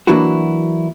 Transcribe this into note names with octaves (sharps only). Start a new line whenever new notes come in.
E3 F#3 A#3 D4 E4 F#4